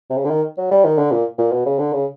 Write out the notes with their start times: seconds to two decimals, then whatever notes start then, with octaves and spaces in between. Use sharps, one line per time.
0.10 C3
0.17 C#3
0.25 D3
0.30 D#3
0.58 F#3
0.71 G3
0.85 D#3
0.98 D3
1.12 A#2
1.38 A#2
1.52 B2
1.66 C#3
1.79 D3
1.93 C#3